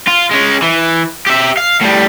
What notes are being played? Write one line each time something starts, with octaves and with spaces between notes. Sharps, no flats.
F4
G#3 C#4
E3
G4 E5
F5
A2 G3